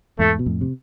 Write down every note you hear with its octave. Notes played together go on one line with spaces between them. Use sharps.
E2 G#2 A3
B2
F2 A2
C3